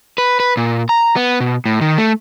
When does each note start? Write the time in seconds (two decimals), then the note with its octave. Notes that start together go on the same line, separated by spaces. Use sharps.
0.18 B4
0.40 B4
0.57 A#2
0.89 A#5
1.16 B3
1.40 B2
1.66 A2
1.81 D#3
1.98 A3